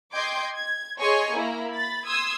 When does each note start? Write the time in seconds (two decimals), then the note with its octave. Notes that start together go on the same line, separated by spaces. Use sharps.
0.13 D#5 G5 C6 D6 G6 G#6
0.54 G#6
0.99 G#4 C#5 D#5 G#5 C6 C#6
1.34 A#3 E4 A#5
1.73 B5 A6
2.06 C6 D#6 E6 G#6